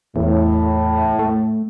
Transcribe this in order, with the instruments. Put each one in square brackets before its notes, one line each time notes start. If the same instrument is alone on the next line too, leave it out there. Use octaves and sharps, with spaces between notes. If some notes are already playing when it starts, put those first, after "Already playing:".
[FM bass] E2 [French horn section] A2
[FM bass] A3